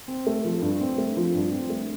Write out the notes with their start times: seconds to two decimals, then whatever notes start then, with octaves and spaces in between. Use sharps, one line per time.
0.08 C4
0.27 A3
0.44 F3
0.62 G2
0.81 C4
0.98 A3
1.17 F3
1.34 G2
1.52 C4
1.70 A3